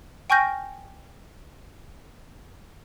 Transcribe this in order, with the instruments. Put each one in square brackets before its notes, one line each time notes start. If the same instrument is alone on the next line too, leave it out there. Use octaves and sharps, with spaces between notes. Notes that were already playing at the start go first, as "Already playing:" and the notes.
[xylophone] G5 G#5 C#6 F6 G6 A#6